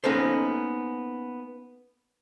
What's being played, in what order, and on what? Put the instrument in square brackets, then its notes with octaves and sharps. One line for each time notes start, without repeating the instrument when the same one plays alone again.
[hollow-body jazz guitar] A#3 B3 C#4 D#4 A4 C5